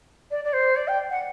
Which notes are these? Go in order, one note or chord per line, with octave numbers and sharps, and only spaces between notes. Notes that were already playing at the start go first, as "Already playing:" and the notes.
D5
D5
C5
D5
G5
F#5